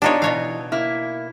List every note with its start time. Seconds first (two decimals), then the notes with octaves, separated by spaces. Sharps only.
0.02 B3 D4 D#4 F4 G4 C#5
0.22 B2 E3 C#5 F5
0.72 A#3 E4